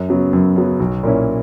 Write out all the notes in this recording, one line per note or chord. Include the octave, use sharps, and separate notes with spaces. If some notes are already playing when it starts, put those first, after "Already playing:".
Already playing: F#2
C#3 F#3 B3
F#2
C#3 F#3 B3
B1
A#2 A#3 C#4 E4